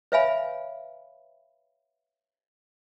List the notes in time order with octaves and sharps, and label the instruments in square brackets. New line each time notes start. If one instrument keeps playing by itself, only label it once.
[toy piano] B4 C#5 E5 F5 G#5 B5